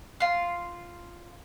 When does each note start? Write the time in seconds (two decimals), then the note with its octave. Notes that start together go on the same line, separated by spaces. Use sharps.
0.20 F4 C6